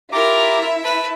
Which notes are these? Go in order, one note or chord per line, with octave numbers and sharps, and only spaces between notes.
E4 F4 G4 A#4 E5 A#5 D6
B4 A5